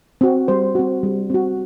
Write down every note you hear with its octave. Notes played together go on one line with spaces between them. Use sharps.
C4 F#4
G3 C5
C4 F#4
G3
C4 F#4